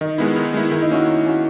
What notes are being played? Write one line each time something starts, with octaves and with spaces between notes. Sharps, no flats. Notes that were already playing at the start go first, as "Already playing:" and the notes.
D#3 D#4
G#3 B3 E4
D#3
G#3 B3 E4
D#3 E4
D#4
A#3 C#4 E4 F#4
D#3
A#3 C#4 F#4